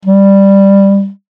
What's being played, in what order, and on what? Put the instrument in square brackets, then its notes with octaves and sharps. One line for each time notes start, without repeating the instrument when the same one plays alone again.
[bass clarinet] G3